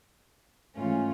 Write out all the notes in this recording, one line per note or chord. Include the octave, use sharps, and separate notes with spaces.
G#2 E3 A3 C#4 F4